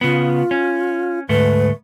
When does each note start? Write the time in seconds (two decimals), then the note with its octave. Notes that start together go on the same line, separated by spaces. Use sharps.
0.01 C#3 B3 F4
0.51 C#4
1.29 D2 G#2 A3 B4